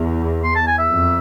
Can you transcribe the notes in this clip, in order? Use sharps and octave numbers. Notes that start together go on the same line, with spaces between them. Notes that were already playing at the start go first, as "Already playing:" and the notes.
Already playing: E2
C6
A5
G#5
E5
F2